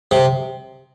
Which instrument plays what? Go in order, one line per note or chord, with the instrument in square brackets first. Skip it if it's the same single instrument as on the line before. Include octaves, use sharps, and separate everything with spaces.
[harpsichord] C3